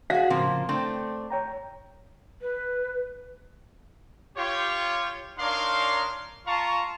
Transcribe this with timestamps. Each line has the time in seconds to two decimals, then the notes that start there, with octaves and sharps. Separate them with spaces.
0.10 F#4 G#4 F5
0.30 A2 C#3 F3 A#3 C4
0.69 A3 C4 D4 G5
1.31 C#5 G5 A#5
2.41 B4
4.37 F4 G4 C#5
5.38 D4 D#4 A#4 C#5 F5 C6
6.46 F4 F5 A5 A#5 C#6